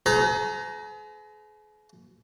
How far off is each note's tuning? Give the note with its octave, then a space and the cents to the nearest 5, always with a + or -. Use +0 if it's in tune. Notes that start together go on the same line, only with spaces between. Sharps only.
G#4 +40 B4 +45 A#5 +0